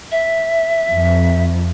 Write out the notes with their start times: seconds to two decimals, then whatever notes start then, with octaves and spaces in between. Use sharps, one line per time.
0.11 E5
0.92 F2